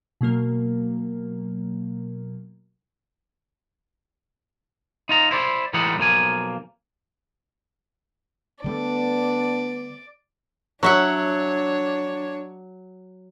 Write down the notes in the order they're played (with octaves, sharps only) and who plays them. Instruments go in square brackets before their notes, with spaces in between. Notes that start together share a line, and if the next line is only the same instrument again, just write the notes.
[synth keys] B2 F#3 A#3 A#4
[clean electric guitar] D#4 F4 A#5
E4 C5 D5
A2 E3 G3 G#3 D#4 F#5
B1 A2 F3 A#3 G#5
[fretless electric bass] D3 G3 A3 [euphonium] B3 [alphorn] D4 [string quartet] D5
[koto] F#3 E5 F#5 [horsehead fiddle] D4 C#5